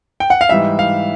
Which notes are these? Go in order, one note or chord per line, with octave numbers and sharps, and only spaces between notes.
G5
F#5
F5
G#2 E3 G3 E5
F5